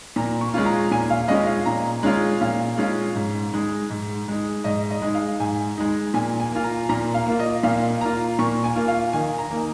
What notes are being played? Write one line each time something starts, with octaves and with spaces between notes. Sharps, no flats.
A#2 A#5
C#6
G#3 C#4 F4
A#5
A#2 G#5
F5
G#3 C#4 F4 D#5
F5
A#2 A#5
G#3 C#4 F4
A#2 F5
G#3 C#4 F4
G#2
G#3 D#4
G#2
G#3 D#4
G#2 D#5
D#5
G#3 D#4
F5
G#2 G#5
G#3 D#4
A#2 G#5
G#5
A#3 F4
A#5
A#2 A#5
F5
A#3 F4
D#5
A#2 F5
A#3 F4 A#5
A#2 C#6
G#5
A#3 F4
F5
D#3 G#5
A#5
A#3 D#4